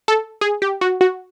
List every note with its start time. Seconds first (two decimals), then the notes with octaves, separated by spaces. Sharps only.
0.08 A4
0.41 G#4
0.62 G4
0.81 F#4
1.01 F#4